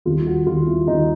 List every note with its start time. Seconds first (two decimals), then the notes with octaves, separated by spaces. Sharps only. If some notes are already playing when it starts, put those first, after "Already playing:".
0.05 D#2 D#3 G3 F4
0.27 F#4
0.47 D#2 D#3 G3 F4
0.67 E4
0.87 D#2 D#3 G3 D#4